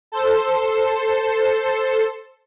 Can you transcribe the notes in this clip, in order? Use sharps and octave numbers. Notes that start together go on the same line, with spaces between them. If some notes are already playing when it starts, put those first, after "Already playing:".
A4 C5